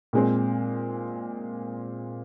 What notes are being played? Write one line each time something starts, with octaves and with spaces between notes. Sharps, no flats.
A#2 G#3 C4